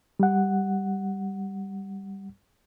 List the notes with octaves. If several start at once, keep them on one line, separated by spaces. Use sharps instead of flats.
G3 F#5